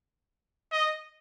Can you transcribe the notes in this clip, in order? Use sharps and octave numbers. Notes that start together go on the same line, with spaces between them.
D#5